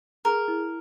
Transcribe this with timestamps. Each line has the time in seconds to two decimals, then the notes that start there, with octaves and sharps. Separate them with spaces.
0.25 G#4 A#4
0.48 E4